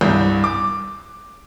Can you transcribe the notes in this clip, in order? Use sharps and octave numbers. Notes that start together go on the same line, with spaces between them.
C2 G2
D6